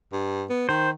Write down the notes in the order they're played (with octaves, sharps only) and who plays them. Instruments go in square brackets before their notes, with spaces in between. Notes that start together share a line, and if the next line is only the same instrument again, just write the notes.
[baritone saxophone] G2
B3
[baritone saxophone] D#3 [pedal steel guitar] C5